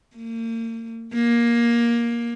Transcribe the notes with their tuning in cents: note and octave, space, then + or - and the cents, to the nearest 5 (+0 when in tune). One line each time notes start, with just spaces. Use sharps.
A#3 -40
A#3 +15